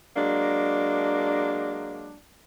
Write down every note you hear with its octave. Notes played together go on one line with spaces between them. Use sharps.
F#3 G#3 A#3 D4